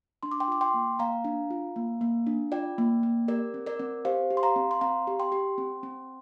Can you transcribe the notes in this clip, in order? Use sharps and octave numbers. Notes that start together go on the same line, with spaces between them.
D4 C6
D6
G5 C6
F4 D6
G5 C6
A#3
A#3 F5 A#5
D4
F4
A#3
A#3
D4
F4 D5 G5
A#3
A#3
G4 A#4 D5
C4
A#4 D5
C4
G4 C5 F5
G4
C6
F5 A#5
C4
C6
C4 F5 A#5
G4
G5 C6
G4
C4
C4